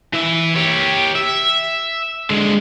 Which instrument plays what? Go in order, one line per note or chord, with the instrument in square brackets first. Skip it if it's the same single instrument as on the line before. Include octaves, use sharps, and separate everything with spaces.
[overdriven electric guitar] E3 E5
G4 C#5
E5
D3 G#3